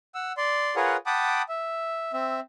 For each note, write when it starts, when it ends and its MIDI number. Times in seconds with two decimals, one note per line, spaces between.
0.15 0.32 78
0.15 0.32 88
0.37 0.75 74
0.37 0.75 84
0.76 0.96 65
0.76 0.96 68
0.76 0.96 70
0.76 0.96 71
0.76 0.96 73
0.76 0.96 78
1.06 1.42 78
1.06 1.42 79
1.06 1.42 81
1.06 1.42 83
1.06 1.42 86
1.06 1.42 87
1.49 2.13 76
2.13 2.40 60
2.13 2.40 76